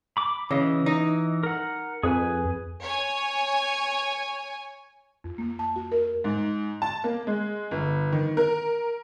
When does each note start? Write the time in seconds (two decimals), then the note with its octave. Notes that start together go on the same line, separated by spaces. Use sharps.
0.17 B5 D6
0.51 C#3 E3 D#5
0.86 D#4
1.43 A#4 F#5
2.03 F2 G#4 B4 G#5
2.83 C#5 G#5
5.24 F2
5.38 A#3
5.59 A5
5.76 F#4
5.92 A#4
6.24 G#2
6.82 A5
7.04 A#3
7.27 G#3
7.71 G1
8.12 D#3
8.37 A#4